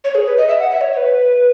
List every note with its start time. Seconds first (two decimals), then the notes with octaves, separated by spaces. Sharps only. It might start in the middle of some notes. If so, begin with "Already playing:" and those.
0.04 C#5
0.15 G#4
0.26 B4
0.38 D#5
0.48 E5
0.59 F#5
0.71 E5
0.81 C#5
0.93 C#5
0.97 B4